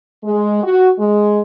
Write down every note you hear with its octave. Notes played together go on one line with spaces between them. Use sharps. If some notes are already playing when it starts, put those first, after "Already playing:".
G#3
F#4
G#3